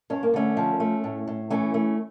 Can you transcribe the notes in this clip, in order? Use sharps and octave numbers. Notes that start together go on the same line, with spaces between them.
G2 C#4
A#3
D3 A3 C#4
F3
A3
A2
A2
E3 A3 C#4
A3